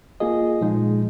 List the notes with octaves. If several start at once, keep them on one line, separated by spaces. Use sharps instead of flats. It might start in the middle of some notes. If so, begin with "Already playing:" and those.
A#3 F4 G#4 D#5
A#2 F3 G#3 D#4